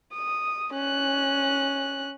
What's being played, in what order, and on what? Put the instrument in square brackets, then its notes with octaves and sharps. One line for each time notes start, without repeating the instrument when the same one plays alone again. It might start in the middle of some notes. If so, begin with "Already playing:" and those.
[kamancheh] D#6
C#4 F#6